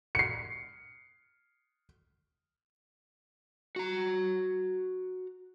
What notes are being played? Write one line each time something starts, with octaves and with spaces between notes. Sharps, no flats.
C7 C#7
F#4 A#5